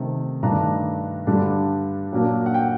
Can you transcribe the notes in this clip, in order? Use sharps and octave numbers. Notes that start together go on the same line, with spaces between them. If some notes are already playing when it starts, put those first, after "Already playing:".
Already playing: C3 D#3 A3 D#4
G2 D#3 A3 D4 A#5
G2 D3 G3 D4
A#2 F#3 A#3 D4
F#5
G5